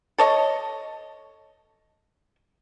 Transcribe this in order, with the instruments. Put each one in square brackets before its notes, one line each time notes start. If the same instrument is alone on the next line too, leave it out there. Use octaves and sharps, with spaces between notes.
[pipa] A4 C#5 D#5